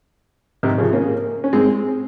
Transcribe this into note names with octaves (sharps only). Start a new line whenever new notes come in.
C3 D#3
C#3 F3
A#3 C#4
C#4
G#3 C4